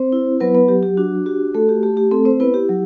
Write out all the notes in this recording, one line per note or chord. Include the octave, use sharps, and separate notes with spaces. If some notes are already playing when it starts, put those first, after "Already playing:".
Already playing: C4 C5
E4
F#3 B3 B4
B3 B4
F#3 G4
G4
D4 F#4
F#4 G4
A3 A4
G4
A3 G4
G4
A3 C4 A4
C4 C5
B3 E4 B4
G4
F#3